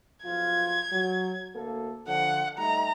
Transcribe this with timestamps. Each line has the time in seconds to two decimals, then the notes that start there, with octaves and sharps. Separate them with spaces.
0.24 B1 F3 F4 G#6
0.92 F#3
1.55 D2 A#3 A4
2.08 D3 F3 F#5
2.58 G3 A3 D#4 A#5